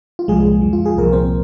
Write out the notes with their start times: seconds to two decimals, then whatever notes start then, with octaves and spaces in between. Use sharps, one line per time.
0.19 F4
0.28 C2 A#2 F3 G#3 G#4
0.61 F2 F3
0.73 F4
0.86 G#4
0.96 C2 A#2 F3 A#4
1.12 C4 C5